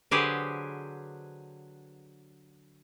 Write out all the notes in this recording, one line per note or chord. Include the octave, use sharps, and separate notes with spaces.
D3 F#3 G4 G#4 B4 C5